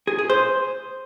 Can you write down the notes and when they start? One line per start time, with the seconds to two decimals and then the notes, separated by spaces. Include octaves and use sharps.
0.07 G#4
0.19 G#4
0.30 C5